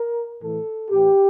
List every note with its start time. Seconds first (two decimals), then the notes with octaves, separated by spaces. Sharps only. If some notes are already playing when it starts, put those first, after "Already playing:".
Already playing: A#4
0.40 A2 E3 A4
0.90 A2 E3 G4